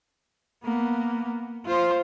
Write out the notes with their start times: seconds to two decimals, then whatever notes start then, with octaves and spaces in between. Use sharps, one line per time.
0.64 A#3 B3
1.66 F4 C5